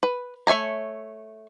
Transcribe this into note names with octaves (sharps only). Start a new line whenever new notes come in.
B4
A3 C#5 E5 G#5 A#5